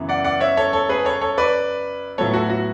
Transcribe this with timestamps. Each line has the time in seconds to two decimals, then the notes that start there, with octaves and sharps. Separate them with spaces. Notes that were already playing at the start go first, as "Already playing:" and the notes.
Already playing: F#2 C#3 E3 B3
0.09 D5 F#5
0.24 D5 F#5
0.41 C#5 E5
0.57 A4 C#5
0.73 A4 C#5
0.89 G#4 B4
1.05 A4 C#5
1.21 A4 C#5
1.38 B4 D5
2.18 A2 F#3 B3 A4 C#5
2.33 F#4 A4
2.50 F#4